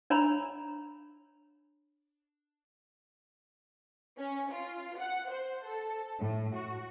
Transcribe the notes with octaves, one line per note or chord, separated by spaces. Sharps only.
D4 C#5 A#5 B5
C#4
F4
F#5
C5
A4
A2
F#4